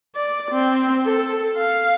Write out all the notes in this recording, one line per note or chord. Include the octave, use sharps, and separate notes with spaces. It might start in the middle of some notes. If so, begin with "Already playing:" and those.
D5
C4
A4
F5